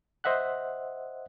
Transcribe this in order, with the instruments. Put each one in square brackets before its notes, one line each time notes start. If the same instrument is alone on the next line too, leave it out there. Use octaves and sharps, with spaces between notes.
[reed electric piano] C5 D#5 E5 F#5 F#6